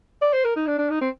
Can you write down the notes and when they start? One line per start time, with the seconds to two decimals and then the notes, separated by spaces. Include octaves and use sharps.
0.22 D5
0.33 C5
0.44 A#4
0.56 D#4
0.67 D4
0.78 D4
0.90 D#4
1.01 C4